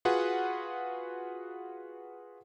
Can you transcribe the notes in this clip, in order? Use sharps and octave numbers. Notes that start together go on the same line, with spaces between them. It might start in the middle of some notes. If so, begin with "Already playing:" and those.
F4 F#4 G#4 B4 F#5